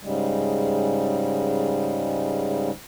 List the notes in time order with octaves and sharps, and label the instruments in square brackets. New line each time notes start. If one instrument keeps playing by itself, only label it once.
[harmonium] G#2 C#3 G3 G#3